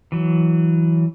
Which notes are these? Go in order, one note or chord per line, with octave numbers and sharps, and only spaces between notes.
E3 F#3